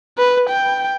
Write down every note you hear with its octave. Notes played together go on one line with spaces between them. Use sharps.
B4
G5